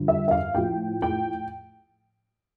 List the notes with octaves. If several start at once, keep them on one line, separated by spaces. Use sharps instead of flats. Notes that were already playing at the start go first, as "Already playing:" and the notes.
Already playing: G2 D3 F3
E5
E5
F5
A2 F3 G5
G5